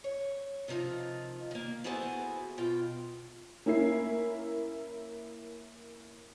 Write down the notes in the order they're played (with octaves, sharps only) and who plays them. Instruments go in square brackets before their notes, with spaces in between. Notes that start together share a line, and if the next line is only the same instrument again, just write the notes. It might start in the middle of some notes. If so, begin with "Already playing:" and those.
[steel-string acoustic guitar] C#5
C3 D#3 F3 D#4 F4
D#3 A#3
B3 E4 F#4 G#4 A4 C5
B2 F4 G5
[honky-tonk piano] A#3 C#4 E4 A#4 C7